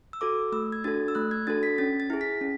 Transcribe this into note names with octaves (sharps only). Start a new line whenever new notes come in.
E6
F#4 A4 D6
A3 E6
G#6
D4 F#4 A4 A6
E6
A3 F#6
G#6
D4 F#4 A4 A6
B6
C#4 A6
A6
E4 G#4
B6
C#4